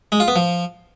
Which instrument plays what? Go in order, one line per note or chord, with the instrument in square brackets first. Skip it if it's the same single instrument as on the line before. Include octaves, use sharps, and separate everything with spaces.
[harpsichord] G#3
F4
B3
F3